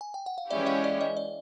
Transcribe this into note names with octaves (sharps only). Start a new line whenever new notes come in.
G#5
G5
F#5
F5
E3 G#3 C#4 E4 G4 D5 E5
D#5 F5
D5
D#5
D5